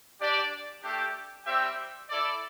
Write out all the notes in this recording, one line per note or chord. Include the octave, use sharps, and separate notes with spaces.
D4 G4 D5 G5
A3 D4 G4
G3 C4 G4 E5 G5
E4 A4 D5